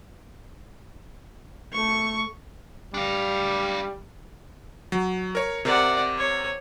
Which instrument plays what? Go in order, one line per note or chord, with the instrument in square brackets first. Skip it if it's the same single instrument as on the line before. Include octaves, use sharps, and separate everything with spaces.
[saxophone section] A3 [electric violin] C#6
[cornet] G3 [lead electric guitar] D4 F5
[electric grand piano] F#3
A#4 C#5
[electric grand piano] C3 A#4 C5 [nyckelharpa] D5 F#5
[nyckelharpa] C#5